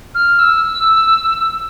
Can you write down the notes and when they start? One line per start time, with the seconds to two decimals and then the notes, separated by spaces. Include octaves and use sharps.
0.15 F6
0.39 E6